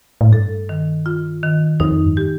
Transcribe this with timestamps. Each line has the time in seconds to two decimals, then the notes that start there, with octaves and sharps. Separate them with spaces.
0.21 A2
0.32 G2 A4
0.69 D#3
1.06 F4
1.43 D#3
1.80 F2 D#4
2.05 G2
2.17 G4